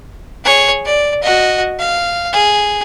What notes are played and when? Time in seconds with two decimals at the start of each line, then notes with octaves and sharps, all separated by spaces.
0.44 G#4 C#5
0.85 D5
1.23 F#4 D#5
1.79 F5
2.33 G#4